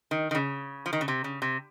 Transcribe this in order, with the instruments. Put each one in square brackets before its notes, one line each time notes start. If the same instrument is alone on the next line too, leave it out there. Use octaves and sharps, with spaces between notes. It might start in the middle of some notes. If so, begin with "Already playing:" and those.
[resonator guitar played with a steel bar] D#3
D#3
C#3
F3
D#3
C#3
C3
C#3
C3